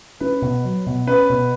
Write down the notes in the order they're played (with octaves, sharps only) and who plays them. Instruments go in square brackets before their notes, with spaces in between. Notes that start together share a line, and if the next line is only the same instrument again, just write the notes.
[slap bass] C#4 [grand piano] B4
[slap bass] B2
F#3
B2
[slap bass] C#4 [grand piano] B4
[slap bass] B2